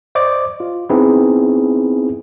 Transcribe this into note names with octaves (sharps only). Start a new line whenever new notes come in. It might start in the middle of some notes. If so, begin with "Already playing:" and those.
C5 D5 D#5 D6
F4
B3 C4 D#4 E4 G#4 B4